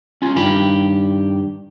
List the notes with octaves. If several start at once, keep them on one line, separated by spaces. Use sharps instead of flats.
C#4 F4
G2 D#3 G4 B5